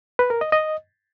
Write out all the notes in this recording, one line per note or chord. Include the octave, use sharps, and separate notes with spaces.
B4
A#4
D#5
D#5